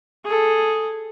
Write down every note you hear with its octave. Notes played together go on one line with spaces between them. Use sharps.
G#4 A4